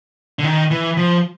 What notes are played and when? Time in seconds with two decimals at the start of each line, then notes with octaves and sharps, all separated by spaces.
0.39 D3
0.44 D#3
0.71 E3
0.97 F3